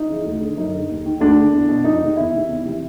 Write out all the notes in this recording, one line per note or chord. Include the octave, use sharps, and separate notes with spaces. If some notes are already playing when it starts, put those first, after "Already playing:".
Already playing: D#4
C#3 E3
D2
D3
F#2 D#4
D3
D#2
D#3
D2 D4
D3
E2
B2
F2 D#4
C3 D#3
E2 E4
C3 D#3
E2
C3 E3